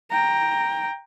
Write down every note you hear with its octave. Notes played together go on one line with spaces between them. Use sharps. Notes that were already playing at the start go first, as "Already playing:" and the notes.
G5 A#5